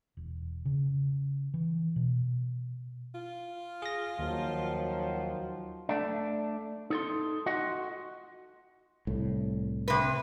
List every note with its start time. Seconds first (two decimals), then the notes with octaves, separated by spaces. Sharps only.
0.17 E1
0.65 C#3
1.54 E3
1.96 B2
3.15 F4
3.82 G#4 A#6
4.19 D#2 D#3 F3 F#3
5.89 A3 D4
6.90 D#4 A4 C6
7.46 F4 F#4 D#5 F#5
9.07 C2 A2
9.88 C3 B4